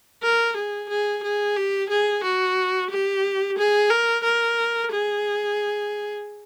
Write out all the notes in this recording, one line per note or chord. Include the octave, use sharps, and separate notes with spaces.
A#4
G#4
G#4
G#4
G4
G#4
F#4
G4
G#4
A#4
A#4
G#4